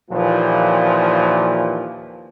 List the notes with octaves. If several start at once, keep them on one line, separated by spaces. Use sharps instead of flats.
D#2 A#2 E3 F3